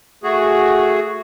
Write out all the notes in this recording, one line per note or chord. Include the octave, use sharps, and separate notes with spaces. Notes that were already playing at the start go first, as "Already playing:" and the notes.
A3 F#4 G#4